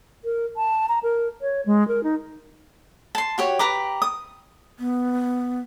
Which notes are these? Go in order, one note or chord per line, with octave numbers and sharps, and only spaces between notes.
A#4
A5
A#5
A#4
C#5
G#3
A#4
D#4
A5 C6
F#4 G4 C#5
G4 B4 A#5 D6
D#6
B3